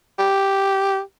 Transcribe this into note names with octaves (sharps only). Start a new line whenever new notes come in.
G4